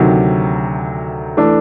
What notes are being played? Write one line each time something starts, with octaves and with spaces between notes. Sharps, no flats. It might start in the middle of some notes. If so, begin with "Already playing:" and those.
Already playing: D2 C3 D#3 F#3
E3 A3 D4